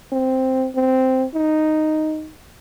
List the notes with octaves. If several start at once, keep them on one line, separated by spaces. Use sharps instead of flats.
C4
C4
D#4